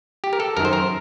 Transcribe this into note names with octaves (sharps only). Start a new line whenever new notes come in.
G4
A#4
A4
F#2 D#3 A#4
C5
A#4